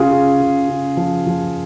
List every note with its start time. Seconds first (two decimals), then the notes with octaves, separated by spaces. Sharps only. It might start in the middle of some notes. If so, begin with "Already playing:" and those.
Already playing: C#3 F4 G#4
0.11 C#3
0.40 C#3
0.68 C#3
0.97 F3
1.26 F3